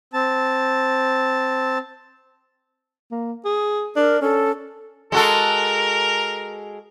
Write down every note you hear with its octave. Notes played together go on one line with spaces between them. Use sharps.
C4 A5
A#3
G#4
D4 A#4
C#4 A4
G#3 F#4 A4 A#4